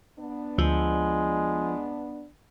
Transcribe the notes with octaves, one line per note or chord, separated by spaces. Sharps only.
B3 D4
D2 F3 G#3 E6 G6